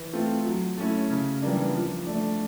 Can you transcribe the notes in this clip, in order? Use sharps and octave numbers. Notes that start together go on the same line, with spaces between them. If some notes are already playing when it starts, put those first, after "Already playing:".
Already playing: E3
A3 C4 F4
F#3
A3 C#4 E4
C#3
E3 G3 A#3 D4
F3
A3 D4